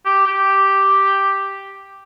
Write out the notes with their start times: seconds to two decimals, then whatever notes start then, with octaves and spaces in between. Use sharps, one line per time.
0.05 G4
0.27 G4